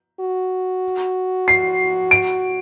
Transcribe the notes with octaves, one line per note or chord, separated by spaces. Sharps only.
F#4
C7
D7